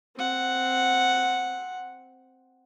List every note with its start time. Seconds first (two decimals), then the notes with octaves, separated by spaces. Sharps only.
0.17 C4 F#5